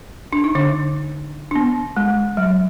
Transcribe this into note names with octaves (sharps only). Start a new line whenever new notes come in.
D4
D#4
D3 D4
D4
B3
G#3
F#3